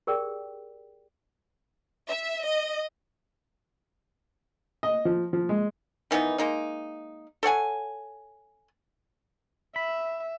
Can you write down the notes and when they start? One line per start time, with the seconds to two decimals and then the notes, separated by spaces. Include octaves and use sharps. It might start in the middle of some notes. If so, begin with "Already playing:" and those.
0.07 G4 G#4 A#4 B4 D5 G5
2.11 E5
2.45 D#5
4.83 D#5
5.05 F3
5.33 F3
5.49 G#3
6.11 D#3 E3 B3 D#4
6.38 G#3 A#3 D#4
7.43 A4 C#5 F#5 G#5
9.76 E5 B5